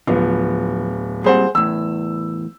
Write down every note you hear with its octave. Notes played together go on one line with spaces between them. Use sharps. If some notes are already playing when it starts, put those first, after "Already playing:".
D1 F3 B3
A#2 G3 C4 G#4 C5 F#5
E2 A2 E6